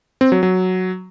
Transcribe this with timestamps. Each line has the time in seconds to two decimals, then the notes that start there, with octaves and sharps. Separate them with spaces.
0.21 C4
0.32 F#3
0.43 F#3